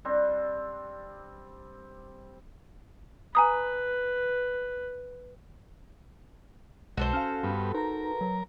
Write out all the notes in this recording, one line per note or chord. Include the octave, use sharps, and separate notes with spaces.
G3 C4 D4
B4 G#5 A#5 D#6
B1 G#3 F#4 A4 C5
C#4 F5 A5 F6
G2 B3
D#4 A#4 B4 A#5
F#3